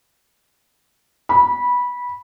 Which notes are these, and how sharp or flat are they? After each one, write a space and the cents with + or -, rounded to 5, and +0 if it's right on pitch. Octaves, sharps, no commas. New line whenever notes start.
B5 -15